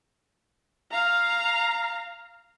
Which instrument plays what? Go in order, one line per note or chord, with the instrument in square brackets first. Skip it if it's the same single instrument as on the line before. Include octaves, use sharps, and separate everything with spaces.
[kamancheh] F5 A#5